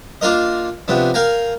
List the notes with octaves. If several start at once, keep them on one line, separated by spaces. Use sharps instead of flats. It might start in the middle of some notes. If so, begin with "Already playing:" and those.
A#3 D4 F4 A#4 D#5
C3 F3 B3 D4
A#4 F5 G5 G#5 A#5